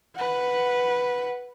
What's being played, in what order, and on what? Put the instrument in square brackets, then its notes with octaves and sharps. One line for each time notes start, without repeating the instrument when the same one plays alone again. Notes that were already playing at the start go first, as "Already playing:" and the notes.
[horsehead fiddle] B4 F#5